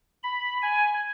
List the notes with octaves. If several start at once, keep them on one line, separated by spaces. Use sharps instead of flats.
B5
G#5